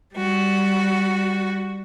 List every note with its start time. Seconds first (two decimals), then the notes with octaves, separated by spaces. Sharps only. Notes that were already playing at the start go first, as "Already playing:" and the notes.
0.15 G3 F#4